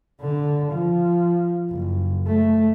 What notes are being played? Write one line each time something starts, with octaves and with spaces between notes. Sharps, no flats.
D3
F3
F#1
A3